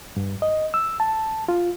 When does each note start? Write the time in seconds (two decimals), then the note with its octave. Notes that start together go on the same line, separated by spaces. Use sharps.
0.17 G2
0.42 D#5
0.74 E6
1.00 A5
1.48 F4